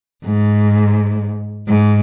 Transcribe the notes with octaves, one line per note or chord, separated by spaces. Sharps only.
G#2
G#2